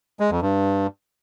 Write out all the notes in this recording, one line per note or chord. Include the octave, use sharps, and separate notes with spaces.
G#3
F2
G2